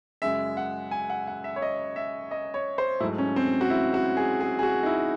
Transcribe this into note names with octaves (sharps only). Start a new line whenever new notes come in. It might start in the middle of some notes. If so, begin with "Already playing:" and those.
F#2 C#3 G#3 E5
F#5
G#5
F#5
F#5
E5
C#5
D#5
E5
D#5
C#5
C5
G#2 F#3 A3 E4
C#4
C4
F#4
E4
F#4
G#4
G#4
G#4
F#4
D#4
E4